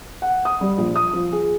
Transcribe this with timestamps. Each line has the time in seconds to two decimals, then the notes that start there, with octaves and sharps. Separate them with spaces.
0.22 F#5
0.45 D#6
0.61 G3
0.78 A#1
0.95 D#6
1.13 F3
1.32 G#4